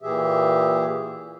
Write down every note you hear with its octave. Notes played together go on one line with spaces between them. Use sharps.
A#2 E3 G4 G#4 E5